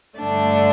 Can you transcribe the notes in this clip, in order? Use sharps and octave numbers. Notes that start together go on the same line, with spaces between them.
G2 D3 A3 D4